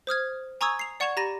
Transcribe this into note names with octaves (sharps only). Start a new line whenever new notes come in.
C5 D#6 F6 G#6
G#5 A#5 C#6 D#6 E6 G#6
C7 F7
D5 F#5 C#6 G#6 E7 F7
G4 A#5 B5 A6 A#6 D#7